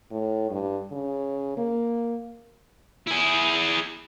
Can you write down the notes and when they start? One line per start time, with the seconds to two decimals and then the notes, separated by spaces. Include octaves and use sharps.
0.11 A2
0.51 G2
0.92 C#3
1.57 A#3
3.07 E4 G#4